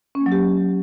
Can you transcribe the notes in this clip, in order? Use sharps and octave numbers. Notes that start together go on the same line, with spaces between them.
C#4
A#3
F#3
G4